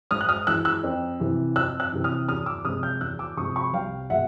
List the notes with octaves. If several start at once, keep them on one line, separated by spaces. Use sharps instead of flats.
G#2 D#6 F6
F#6
D#6 F6
E3 G#3 E6 F#6
E6 F#6
F2
C3 E3
F2 E6 F#6
E6 F#6
C3 E3
D#6 F6
E2 D#6 F6
D6 E6
C3 F3 G#3 D#6 F6
F6 G6
E2 E6 F#6
D6 E6
C3 F3 G#3 C#6 D#6
B5 C#6
C2 F5 G5
B2 G#3 E5 F#5